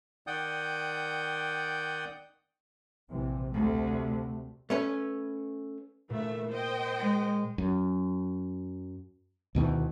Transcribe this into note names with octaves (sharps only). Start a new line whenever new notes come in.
D#3 D5 F#5 G5 D#6 G6
A#1 C3 E3
D2 C3 A3
A3 C#4 B4
A#2 E3 A3 E5
C5 D#5 G5
G#3
F#2
D2 B2 D#3 E3